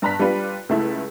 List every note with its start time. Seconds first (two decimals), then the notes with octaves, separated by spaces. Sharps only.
0.02 G2 A5 A#5 F#6 B6
0.20 G3 D4 F4 G4 B4
0.69 C#2 A3 E4